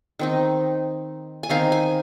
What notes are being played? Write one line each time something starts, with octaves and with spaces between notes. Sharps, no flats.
D#3 C4 D#4
G#5
D#3 C4 D#4 F5
G#5